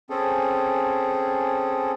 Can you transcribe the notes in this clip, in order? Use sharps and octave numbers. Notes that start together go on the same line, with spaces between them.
C4 C#4 G#4 A4